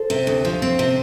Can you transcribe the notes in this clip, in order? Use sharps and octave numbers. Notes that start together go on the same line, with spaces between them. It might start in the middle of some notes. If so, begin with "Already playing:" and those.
Already playing: A4 C5
C3
D2
F3
C4
C3